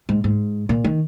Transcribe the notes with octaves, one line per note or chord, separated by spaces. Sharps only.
G#2
G#2
A#2
D#3